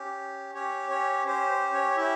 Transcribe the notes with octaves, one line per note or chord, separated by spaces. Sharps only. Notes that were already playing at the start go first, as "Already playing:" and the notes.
Already playing: C#4 G4
C#4 G4 C#5
C#4 C#5
C#4 G4 C5
C5
C#4 C#5
C#5
C#4 E4 G4 E5